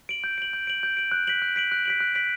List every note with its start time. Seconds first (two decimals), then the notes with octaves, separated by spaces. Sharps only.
0.09 D7 F#7
0.24 G6
0.38 D7 F#7
0.53 G6
0.67 D7 F#7
0.83 G6
0.97 D7 F#7
1.12 F#6
1.27 B6 D7 F#7
1.42 F#6
1.56 B6 D7 F#7
1.72 F#6
1.85 B6 D7 F#7
2.00 F#6
2.15 B6 D7 F#7